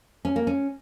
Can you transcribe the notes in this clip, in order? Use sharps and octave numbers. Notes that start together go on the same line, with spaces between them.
C#4
A#3
C#4